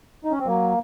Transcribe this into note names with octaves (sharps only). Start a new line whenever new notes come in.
D#4
C#4
C4
F#3 A#3